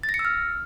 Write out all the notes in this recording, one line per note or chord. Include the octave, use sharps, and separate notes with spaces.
A6
A#6
C#7
E6
F6